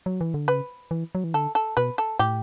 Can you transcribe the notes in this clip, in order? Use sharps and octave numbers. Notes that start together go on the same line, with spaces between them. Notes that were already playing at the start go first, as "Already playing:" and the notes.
F#3
E3
D3
C#3 B4
E3
F#3
E3
D3 A4
A4
B2 B4
A4
A2 G4